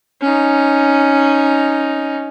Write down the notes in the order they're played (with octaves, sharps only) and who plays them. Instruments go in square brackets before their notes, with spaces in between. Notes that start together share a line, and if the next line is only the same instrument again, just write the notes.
[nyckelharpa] C#4 D#4